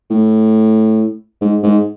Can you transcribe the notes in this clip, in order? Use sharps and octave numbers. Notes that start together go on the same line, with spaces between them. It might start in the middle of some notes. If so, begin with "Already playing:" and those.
A2
G#2
G#2